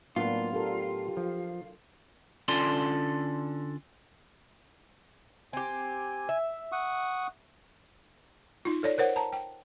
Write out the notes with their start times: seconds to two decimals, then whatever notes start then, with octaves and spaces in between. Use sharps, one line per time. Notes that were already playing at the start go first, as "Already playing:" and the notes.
0.16 A2 F#3 A#3 B3 D4 F4
0.53 D4 G4 A4 A#4
1.17 F3
2.48 D3 C#4 F4 A4 D5 C6
5.53 C4 G4 G#5
6.29 E5
6.72 F#5 C#6 D#6
8.65 D#4 F4
8.83 A4 C#5 D5
8.98 A#4 C5 C#5 F#5
9.16 A5 A#5
9.32 G5